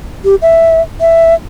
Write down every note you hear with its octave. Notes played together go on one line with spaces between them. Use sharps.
G4
E5
E5